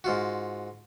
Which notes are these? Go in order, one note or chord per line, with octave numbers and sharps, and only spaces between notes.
G#2 F4 F#4